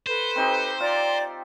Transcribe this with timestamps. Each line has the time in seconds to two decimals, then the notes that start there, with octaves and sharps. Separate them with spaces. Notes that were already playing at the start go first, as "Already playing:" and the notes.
0.06 A4 B4 C5
0.36 C4 D#4 G4
0.80 F4 D5 A#5